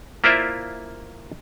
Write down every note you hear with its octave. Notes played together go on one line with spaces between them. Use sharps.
A#3 E4 F4 C5 D5 E5